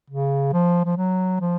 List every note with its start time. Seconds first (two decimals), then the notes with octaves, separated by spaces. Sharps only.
0.10 C#3
0.53 F3
0.85 F3
0.97 F#3
1.40 F3